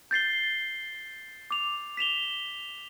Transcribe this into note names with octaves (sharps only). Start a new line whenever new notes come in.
G6 A6 C7 G7
D6 F7
B6 E7 F7 G7